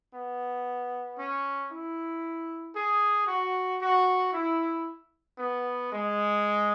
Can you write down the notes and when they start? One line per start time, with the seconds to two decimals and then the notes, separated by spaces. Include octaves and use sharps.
0.11 B3
1.16 C#4
1.69 E4
2.74 G#4
3.27 F#4
3.80 F#4
4.32 E4
5.37 B3
5.89 G#3